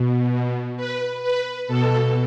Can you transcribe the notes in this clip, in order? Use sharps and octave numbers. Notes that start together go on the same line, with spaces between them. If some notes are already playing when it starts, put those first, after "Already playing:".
Already playing: B2
B4
B4
B2 A4